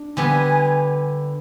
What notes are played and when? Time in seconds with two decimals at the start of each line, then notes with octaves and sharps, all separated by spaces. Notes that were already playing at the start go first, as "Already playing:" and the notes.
Already playing: D4
0.17 D3 G3 B3 G#5